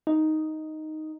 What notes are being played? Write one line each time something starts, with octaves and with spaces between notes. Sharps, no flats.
D#4